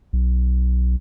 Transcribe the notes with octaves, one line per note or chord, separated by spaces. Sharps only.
B1